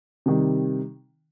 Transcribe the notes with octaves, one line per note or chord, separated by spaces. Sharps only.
C3 D#3 G3